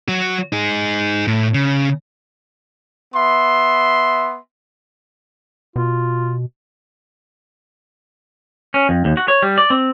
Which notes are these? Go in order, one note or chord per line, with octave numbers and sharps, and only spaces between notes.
F#3 F#4
D#4 G#4
A2
C#3
B3 E5 C6
B2 F4
C#4
F2
D#2
F#4
C#5
G3
D5
C4